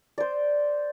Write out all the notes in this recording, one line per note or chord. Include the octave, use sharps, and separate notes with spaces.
C5 D5